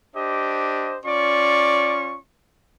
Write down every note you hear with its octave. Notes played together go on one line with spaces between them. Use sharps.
D4 G4 C5 D#5
C#4 F4 D5 C#6